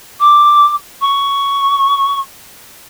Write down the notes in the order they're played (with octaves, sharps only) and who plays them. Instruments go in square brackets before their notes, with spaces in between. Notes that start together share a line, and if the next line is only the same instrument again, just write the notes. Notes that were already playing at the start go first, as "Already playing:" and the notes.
[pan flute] D6
C#6